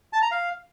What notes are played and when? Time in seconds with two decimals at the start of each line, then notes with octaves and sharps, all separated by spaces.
0.13 A5
0.22 A#5
0.31 F5